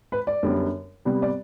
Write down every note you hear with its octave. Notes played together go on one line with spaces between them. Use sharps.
B4
D5
F#2 D3 G3 B3
C3 G3 B3
D5